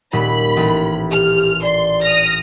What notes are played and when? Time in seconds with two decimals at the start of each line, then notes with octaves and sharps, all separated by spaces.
0.13 D#1 B5
0.57 A1
1.11 G4 F6
1.63 D5 C6
2.02 D#6 F6 A#6